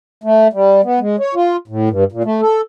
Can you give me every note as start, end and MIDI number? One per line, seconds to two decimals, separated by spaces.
0.24 0.48 57
0.53 0.81 55
0.84 0.99 59
1.00 1.16 56
1.19 1.34 73
1.35 1.56 65
1.68 1.89 45
1.89 2.04 43
2.12 2.23 46
2.24 2.41 57
2.41 2.61 69